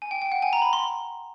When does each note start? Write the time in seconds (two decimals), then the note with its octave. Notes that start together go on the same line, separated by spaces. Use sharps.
0.02 G#5
0.11 G5
0.22 G5
0.32 F#5
0.42 G#5
0.53 A#5
0.62 B5
0.73 C6